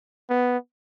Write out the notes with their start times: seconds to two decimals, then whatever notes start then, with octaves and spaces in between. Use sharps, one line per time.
0.30 B3